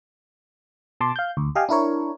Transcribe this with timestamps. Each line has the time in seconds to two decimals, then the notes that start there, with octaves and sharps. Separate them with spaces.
1.01 B2 A5 C6 D6
1.16 F5 G6
1.37 D2
1.55 G4 D#5 F5 G5 G#5
1.69 D4 E4 A#4 C#5